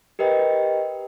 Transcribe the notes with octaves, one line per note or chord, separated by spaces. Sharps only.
G4 A#4 B4 D#5 G5